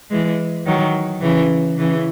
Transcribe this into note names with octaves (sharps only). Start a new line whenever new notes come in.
E3 G#3
D#3 F#3
C#3 E3
C#3 E3